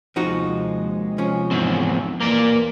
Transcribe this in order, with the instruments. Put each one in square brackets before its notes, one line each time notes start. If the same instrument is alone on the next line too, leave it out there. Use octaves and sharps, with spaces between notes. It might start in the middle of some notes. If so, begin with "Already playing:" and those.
[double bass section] D#2 C3 G#3 [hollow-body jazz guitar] F3 D#4 F#4
[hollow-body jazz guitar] F3 C#4
[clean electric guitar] E2 G#2 C4
[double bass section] D#2 E3 [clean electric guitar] A#3 A#4 D5